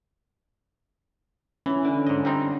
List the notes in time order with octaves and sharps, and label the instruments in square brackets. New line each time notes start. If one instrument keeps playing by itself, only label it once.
[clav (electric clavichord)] E3 [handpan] C#4 E4
[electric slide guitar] D3
[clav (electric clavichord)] G#2 D#5 [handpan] C#4
[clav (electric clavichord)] G3 C4 D#4